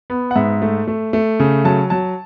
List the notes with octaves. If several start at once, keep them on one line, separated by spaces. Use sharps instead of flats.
B3
F#5
G#2 E5
A3
A3
A3
C#3
F#3 A5
F#3 A5